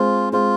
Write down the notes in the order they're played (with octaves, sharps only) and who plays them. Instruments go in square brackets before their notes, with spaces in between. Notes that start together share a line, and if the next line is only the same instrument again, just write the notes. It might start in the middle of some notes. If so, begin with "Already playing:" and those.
Already playing: [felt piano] G#3 C4 [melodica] F4
[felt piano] G#3 C4 [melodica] F4